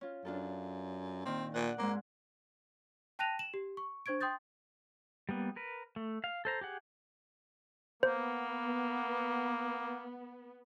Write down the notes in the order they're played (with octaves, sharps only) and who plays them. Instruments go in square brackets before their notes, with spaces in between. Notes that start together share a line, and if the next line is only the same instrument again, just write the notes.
[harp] C#4 F4
[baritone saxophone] F#2 [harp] D4 F4 A4
[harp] A#2 D#3 [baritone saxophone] C4
[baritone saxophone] A#2 [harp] D5 F#5
[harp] G#2 G#3 C4 [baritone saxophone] A#3
[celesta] G5 A5 F#6 A#6 D#7 F7
E7 F#7
G4
C#6
D4 C5 C#6 G#6 D7
G5 C6 D#6 G6 A6
[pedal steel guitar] G3 A#3 B3
A#4 B4
A3
F5
A4 C5 A#5
G4 G#4 F#5
[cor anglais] A#3 [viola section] B3 [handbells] C5